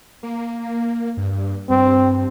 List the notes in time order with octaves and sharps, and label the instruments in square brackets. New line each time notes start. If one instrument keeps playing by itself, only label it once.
[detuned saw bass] A#3
G2
[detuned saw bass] G2 [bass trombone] C4